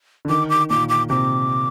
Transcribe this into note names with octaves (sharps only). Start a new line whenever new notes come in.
D3
D#3 D6
D6
A#2 D6
D6
C3 D6